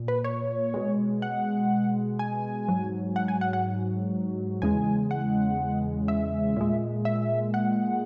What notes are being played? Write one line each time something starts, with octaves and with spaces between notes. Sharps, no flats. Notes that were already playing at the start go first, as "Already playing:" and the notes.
Already playing: A#2
B4
C#5
B2 G#3
F#5
G#5
G#2 F#3
F#5
G#5
F#5
F#5
E2 C#3 G#3 G#5
F#5
E5
A#2 G#3
E5
F#5